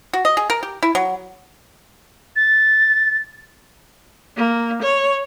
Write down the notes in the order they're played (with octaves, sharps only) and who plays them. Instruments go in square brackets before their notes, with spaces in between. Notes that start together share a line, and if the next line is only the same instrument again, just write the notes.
[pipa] F#4
D#5
G#4
A#4
G4
E4
F#3
[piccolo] A6
[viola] A#3
C#5